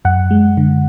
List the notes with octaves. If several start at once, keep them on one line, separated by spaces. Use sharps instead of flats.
F#2 F#5
G#3
D3